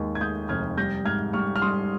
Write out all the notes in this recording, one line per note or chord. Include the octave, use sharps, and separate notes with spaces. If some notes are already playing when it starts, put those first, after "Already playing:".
Already playing: D#2 G#3
G#6
G#3 D#6 G6
F1 F6 G#6
G3 G6 A#6
G#2 F6 G#6
G3 C#6 F6
F6
G3 C6 D#6